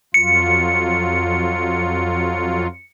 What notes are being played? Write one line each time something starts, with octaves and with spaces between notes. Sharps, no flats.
F2 F#3 F4 C#7